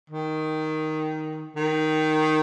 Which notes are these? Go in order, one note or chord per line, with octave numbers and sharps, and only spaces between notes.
D#3
D#3